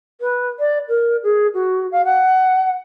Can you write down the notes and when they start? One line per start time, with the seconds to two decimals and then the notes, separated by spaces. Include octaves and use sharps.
0.20 B4
0.59 D5
0.88 A#4
1.23 G#4
1.53 F#4
1.91 F5
2.04 F#5